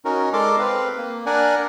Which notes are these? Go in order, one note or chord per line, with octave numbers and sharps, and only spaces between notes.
C#4 D#4 F#4 A#4
G#3 A4 A#4 D5 C6 D6
C4 B4 F5
A#3
D4 A#4 D5 F#5 G#5